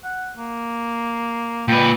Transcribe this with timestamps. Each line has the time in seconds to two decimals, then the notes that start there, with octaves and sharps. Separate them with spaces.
0.04 F#5
0.37 A#3
1.68 A#2 B4 G5